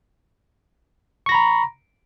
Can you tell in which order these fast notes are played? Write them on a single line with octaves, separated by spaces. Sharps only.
C#6 A#6 B5 A#5